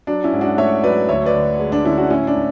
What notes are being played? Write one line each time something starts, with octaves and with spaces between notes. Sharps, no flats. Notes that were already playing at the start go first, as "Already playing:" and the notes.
F#3 D4
C#4 E4
G#2
D4 F#4
A3 C#5 E5
F#3 B4 D5
D2 C#5 E5
B4 D5
D3
G#3
D4
D3 C#4 E4
D4 F#4
A2 C#4 E4
D4
A2